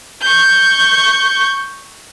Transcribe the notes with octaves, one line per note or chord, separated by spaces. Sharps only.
C#6 G6